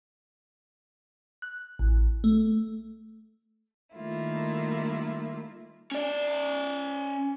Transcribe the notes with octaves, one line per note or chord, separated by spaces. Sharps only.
F#6
A1
A3
D#3 G3 A3 A#3 E4 F4
C#4 D5